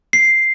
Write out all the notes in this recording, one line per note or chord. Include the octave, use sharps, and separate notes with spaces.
C7